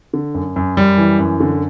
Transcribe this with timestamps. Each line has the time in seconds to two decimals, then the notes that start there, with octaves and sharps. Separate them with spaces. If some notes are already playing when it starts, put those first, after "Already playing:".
0.14 D3
0.35 F#2
0.56 F#2
0.77 F#2 G3
0.98 E3
1.19 F#2
1.40 D3